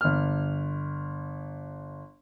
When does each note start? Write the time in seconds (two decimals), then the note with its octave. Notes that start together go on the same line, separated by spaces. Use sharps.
0.01 G1 F6